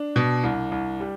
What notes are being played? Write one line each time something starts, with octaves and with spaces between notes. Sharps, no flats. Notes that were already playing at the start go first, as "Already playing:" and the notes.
Already playing: D4
B2
C2
C2
G3